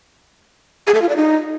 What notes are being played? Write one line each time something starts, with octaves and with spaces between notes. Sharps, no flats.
G#4
A4
F4
D5
D#4